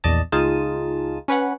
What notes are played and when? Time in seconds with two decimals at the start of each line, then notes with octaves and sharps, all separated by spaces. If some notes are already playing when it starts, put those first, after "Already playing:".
0.04 A#1 E2 D5 D#5 A5
0.32 C#2 D#4 F4 G#4 A5 D#7
1.28 C#4 B4 C#5 F#5